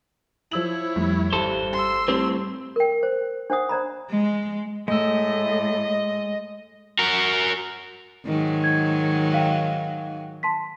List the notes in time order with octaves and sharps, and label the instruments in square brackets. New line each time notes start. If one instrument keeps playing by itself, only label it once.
[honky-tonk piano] F3 E6 F#7 [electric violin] E4 C#5
[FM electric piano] F2 G3 [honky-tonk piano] A2
[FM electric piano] G#1 [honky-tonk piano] G2 [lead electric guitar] A4 C5
[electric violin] C6 E6
[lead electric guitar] A2 C4 [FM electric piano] G3 [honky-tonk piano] C5
[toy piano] A#4 G5
C5
D4 C5 F#5 D#6
C5 D5 A#5 B5
[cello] G#3
[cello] A2 [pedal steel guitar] G#3 E6 [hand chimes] A3 [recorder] D#5
[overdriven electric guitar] F#4 A#4
[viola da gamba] G#2 D#3 F#3
[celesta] G#6
F5 G5
A5 C6 B6